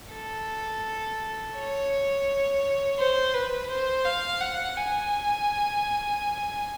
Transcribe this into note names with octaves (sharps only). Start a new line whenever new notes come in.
A4
C#5
C5
B4
C5
F5
F#5
G#5